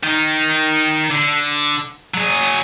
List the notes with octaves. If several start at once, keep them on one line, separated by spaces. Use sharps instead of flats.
D#3 D#4
D3
F#3 G#4